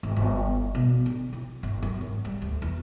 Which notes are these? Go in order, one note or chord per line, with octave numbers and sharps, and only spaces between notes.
G#1
G1
B2
D3
E4
G1
F#2
G#1
G3
D2
E2